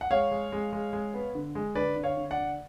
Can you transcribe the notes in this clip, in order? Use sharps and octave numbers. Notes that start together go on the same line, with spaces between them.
F#5
G#3 C#5 F5
G#3
G#3
G#3
G#3
B3
D3
G#3
D3 B4 D5
D3
C#5 F5
D3
D5 F#5
D3